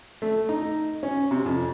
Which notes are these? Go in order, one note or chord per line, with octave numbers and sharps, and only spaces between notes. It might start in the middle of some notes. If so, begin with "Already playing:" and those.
A3
D#4
C#4
C3
F2